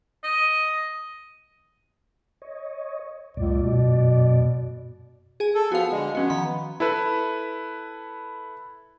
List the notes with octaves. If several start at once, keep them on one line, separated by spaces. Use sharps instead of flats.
D#5
C#5 D#5
C#2 F#2 A#2 D5
B2
G#4 G#5
A4
F3 B3 F#4 F5
D3 G#3
F3 B3 C#4 F#4
D#3 F3 B5
E4 A4 B4